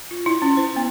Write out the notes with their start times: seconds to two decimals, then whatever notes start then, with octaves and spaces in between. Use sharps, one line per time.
0.11 F4
0.26 E4
0.42 C#4
0.57 C5
0.76 B3